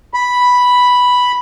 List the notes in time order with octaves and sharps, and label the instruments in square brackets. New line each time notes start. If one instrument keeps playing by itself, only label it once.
[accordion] B5